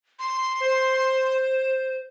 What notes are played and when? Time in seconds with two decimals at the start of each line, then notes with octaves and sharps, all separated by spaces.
0.19 C6
0.60 C5